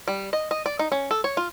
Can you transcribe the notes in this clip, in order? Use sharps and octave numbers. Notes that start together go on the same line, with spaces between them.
G3
D#5
D#5
D5
D#4
C#4
A4
C#5
F4